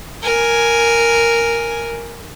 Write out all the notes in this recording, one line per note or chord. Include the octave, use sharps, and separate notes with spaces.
A#4 G#5